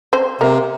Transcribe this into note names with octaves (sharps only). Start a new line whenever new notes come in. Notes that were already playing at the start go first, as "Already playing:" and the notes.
C4 C5
C3 A#3 A#4